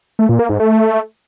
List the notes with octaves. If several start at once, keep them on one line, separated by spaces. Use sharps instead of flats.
A3
A#2
A#3
G#2
A3